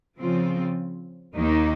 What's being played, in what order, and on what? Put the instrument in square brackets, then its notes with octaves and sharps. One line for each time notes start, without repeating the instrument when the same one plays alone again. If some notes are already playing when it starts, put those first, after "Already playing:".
[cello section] C#3 F3 C4 F4
D#2 D#3 A#3 D#4